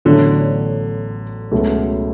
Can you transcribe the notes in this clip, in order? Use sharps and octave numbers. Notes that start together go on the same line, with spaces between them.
A1 A2 D3 F#3 B3
C#2 B2 F#3 A3